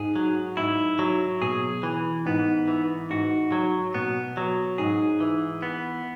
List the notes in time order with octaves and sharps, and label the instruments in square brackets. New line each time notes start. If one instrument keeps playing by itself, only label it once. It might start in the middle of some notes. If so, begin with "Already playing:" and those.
Already playing: [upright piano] G#2 [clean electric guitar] G#4
[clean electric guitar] F#3
[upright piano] G#2 [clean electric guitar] E4
[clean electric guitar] F#3
[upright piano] B2 [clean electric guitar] G#4
[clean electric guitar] E3
[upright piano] G#2 [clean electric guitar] B3
[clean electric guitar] E3
[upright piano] G#2 [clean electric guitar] F#4
[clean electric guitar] F#3
[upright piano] B2 [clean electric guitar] B3
[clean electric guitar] F#3
[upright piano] G#2 [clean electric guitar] G#4
[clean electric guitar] E3
B3